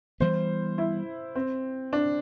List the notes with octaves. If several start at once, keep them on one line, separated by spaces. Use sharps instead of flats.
E3 G3 B3 C5
E4
C4
D4